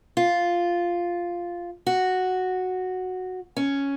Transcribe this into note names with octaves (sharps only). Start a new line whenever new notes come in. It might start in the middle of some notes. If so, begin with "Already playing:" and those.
F4
F#4
C#4